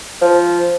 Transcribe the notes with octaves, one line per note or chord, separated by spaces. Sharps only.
F3